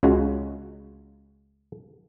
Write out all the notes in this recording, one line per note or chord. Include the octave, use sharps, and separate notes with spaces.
C#2 C#3 G#3 F#4